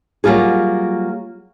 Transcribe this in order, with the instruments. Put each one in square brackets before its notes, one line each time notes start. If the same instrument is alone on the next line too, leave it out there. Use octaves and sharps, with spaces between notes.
[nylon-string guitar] F#3 G3 A#3 F4 G#4